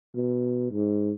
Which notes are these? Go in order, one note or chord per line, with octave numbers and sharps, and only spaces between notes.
B2
G#2